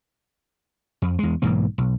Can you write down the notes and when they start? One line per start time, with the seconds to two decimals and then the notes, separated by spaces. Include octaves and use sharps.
1.02 F2
1.19 E2 G#3
1.42 B1 G#2 E3 A#3
1.78 B1